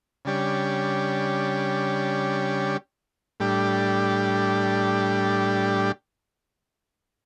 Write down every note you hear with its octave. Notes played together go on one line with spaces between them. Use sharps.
C#3 G3 D4 G4 C#5
A2 G3 D4 G4